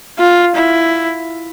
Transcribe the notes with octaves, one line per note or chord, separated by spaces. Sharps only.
F4
E4